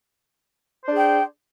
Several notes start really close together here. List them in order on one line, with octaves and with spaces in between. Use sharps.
C5 D4 G#4 G5